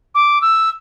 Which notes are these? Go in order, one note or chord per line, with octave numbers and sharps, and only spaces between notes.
D6
E6